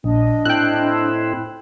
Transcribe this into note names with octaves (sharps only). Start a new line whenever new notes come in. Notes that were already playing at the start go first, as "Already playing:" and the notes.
A#1 D4 D#5
A2 C4 E4 G5 F#6